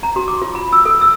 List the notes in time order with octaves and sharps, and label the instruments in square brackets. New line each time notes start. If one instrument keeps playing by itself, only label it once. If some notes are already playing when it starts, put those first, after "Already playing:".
[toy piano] A#5
F#4
D6
F4
B5
E6
A4
E6